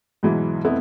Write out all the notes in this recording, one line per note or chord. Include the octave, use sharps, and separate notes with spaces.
G#2 B2 E3 F#3 E4
F2 A3 B3 C4 E4